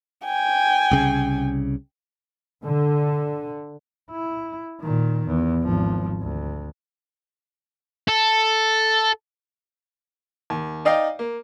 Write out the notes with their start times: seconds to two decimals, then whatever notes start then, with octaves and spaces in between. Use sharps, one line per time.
0.25 G5 G#5
0.91 C2 C#3
2.64 D3
4.11 E4
4.81 A#2 D#3
5.27 E2
5.63 G#1 F3
6.21 D2
8.08 A4
10.50 D#2
10.85 D#4 D5 D#5 F5 G5
11.19 A#3